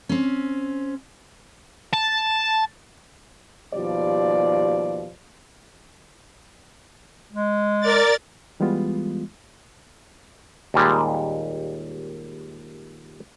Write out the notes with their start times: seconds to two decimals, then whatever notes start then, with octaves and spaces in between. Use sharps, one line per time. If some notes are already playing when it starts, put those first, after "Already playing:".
0.09 C4 C#4
1.94 A5
3.74 D#2 B2 F3 G3 D5
7.32 G#3
7.80 A#4 D5 A6
8.60 E3 G3 G#3 B3 F4
10.74 D#2 A#2 G3 G#3